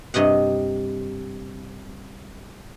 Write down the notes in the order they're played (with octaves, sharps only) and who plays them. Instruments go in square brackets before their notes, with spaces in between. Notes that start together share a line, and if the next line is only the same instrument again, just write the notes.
[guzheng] G2 C3 D#5 F#5